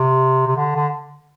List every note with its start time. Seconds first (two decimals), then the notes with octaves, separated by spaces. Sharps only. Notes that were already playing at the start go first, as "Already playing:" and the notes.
Already playing: C3
0.48 C3
0.56 D3
0.76 D3